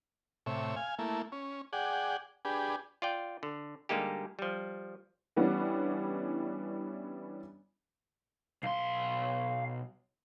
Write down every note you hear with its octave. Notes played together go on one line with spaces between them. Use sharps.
A2 C3 C#5 E5
F5 G#5
A3 A#3 E4
C#4
G#4 D5 F#5 G5
D4 G4 G#4 B4
F4 D5 G5
D3
D3 G3 G#3 A#3 D#4 G4
F3 G3
E3 G3 B3 C#4 D4
B1 F5 C6